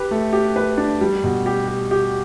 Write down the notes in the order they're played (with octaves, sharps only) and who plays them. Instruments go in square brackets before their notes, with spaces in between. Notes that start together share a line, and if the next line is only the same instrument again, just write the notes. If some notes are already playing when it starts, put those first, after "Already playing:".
Already playing: [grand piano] G4 B4
A3
G4
B4
D4
G3
B2
G4
G4
G4